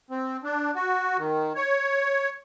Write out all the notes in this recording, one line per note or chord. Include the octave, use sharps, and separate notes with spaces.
C4
D4
F#4
D#3
C#5